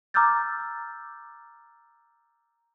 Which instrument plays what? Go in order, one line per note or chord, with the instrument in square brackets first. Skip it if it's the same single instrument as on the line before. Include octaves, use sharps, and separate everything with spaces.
[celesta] A#5 D6 E6 F6 G6 A6